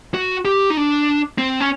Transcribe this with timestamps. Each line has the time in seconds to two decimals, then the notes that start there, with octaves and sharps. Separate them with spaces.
0.14 F#4
0.45 G4
0.70 D#4
0.77 D4
1.38 C4
1.60 C#4